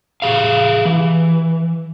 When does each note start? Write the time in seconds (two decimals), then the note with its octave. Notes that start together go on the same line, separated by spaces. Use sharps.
0.22 G4 G#4 F5
0.85 E3